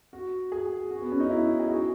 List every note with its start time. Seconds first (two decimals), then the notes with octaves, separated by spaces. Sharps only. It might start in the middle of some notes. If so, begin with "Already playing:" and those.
0.13 F#4
0.52 G#4
0.91 F#4
1.02 B3
1.12 C#4
1.20 D#4
1.30 E4
1.60 G#4
1.68 F#4